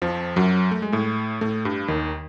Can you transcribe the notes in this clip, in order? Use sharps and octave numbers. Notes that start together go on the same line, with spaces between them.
F2 F3
F#2 F#3
A3
G#3
A2 A3
A2 A3
G2 G3
D#2 D#3